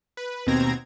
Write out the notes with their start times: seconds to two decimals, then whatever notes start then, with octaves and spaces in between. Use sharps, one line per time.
0.17 B4
0.47 D#2 B2 C4 A#5 G#6 A#6